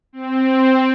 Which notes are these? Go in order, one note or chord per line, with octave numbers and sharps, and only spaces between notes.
C4